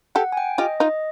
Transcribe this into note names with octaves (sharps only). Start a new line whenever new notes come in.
G4 A4 F#5
G#5
G5
F4 G4 D#5
D#4 F4 D#5